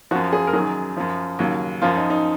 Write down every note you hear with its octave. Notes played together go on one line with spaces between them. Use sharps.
F#2 F3 F#4
G#4
A#4
F#2 D#3 F#3 G#4
F#2 F3
D#2 C#3 F#3
F#2 F3 F4
D#4
D#4